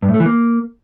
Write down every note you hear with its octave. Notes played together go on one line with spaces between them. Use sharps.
G2
A2
A3
E3
A#3